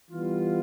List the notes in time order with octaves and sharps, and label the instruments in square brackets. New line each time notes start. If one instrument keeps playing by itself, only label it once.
[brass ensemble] E3 G3 B3 F4